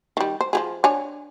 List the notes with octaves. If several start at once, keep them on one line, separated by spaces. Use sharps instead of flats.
D#3 G3
C5
F3 G4 G#4
D4 C#5 G#5